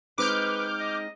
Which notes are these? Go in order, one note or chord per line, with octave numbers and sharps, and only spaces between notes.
G#3 C4 D#4 B4 D6 F6 G6
D#5